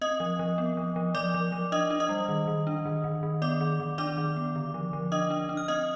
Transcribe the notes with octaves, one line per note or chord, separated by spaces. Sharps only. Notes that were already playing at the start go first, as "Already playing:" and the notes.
C4 D#5 D#6
F3
F3
B3
F3
F3
F3 D5 D6
F3
F3
D4 D#5 D#6
D4
D#5 D#6
G3
D#3
D#3
D4
D#3
D#3
D#3
B3 D5 D6
D#3
D#3
D4 D5 D6
D#3
B3
D3
F3
F3
D4 D#5 D#6
D4
D4
F6
C4 D#5 D#6